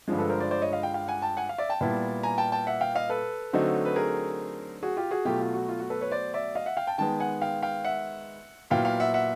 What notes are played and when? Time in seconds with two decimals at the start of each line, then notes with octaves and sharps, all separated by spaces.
0.08 G2 D3 F3 G#3
0.18 A4 B4
0.30 A#4 C5
0.40 C5 D5
0.51 C5 D5
0.62 C#5 D#5
0.72 D#5 F5
0.83 F5 G5
0.94 F5 G5
1.08 F#5 G#5
1.22 G5 A5
1.37 F#5 G#5
1.49 F5
1.58 D5 E5
1.69 G5 A5
1.81 A#2 G3 B3 E4
2.23 G#5 A#5
2.38 G5 A5
2.52 G5 A5
2.67 E5 F#5
2.81 F5 G5
2.95 D#5 F5
3.09 A4 B4
3.53 D3 F#3 A3 C4 D#4
3.85 B4
3.96 G#4 A#4
4.83 F#4 G#4
4.97 F4 G4
5.11 F#4 G#4
5.25 B2 F#3 A3 F4 G4
5.40 F4
5.54 F#4
5.69 F4
5.80 F#4
5.90 A4 B4
6.01 B4 C#5
6.11 C5 D5
6.34 D5 E5
6.55 D#5 F5
6.66 E5 F#5
6.77 F5 G5
6.87 G5 A5
6.98 D#3 G#3 B3 G5 A5
7.20 F#5 G#5
7.42 F5 G5
7.62 F5 G5
7.85 E5 F#5
8.70 A#2 F#3 B3 E4 F5 G5
8.85 F5 G5
9.00 E5 F#5
9.14 E5 F#5